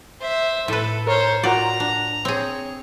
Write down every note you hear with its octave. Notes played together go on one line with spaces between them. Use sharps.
C5 E5
A2 A4 B4
A#4 C5 C#5
F4 F#4 A#4 D5 A#5
D4
C4 G#4 C#5